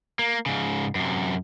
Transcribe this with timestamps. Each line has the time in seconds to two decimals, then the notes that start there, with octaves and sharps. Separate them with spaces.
0.19 A#3
0.46 G#2 C#3
0.95 F#2 C3